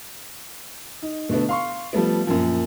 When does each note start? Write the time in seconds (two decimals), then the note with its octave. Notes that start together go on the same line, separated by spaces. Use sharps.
1.02 D#4
1.29 B2 D3 A3 B3
1.49 F5 C6 C#6
1.93 F3 G3 A3 B3
2.27 F#2 A#2 F3